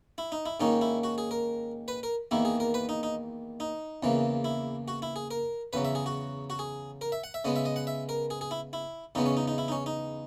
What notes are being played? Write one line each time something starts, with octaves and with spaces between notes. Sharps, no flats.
E4
D#4
E4
G#2 D#3 A#3 C#4 D#4
E4
F#4
G#4
A#4
B4
A#4
E2 D#3 A#3 E4
G#4
A#4
B4
D#4
D#4
D#4
E2 C#3 E3 A#3
E4
F#4
E4
G#4
A#4
E2 C#3 F#3 B4
E5
G#4
F#4
F#4
G#4
A#4
E5
F#5
E5
C#3 G#3 B3 D#5
E5
D#5
F#5
E5
A#4
G#4
G#4
E4
E4
E2 C#3 G#3 B3 D#4
C#4
D#4
D#4
E4
D#4
C#4
D#4